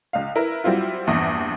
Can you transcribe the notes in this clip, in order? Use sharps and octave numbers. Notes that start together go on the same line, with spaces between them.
C#2 F5
E4 A#4 B4
F#3 G3 C4 E4 F4
A#1 E2 G2 E5 D#6 A#6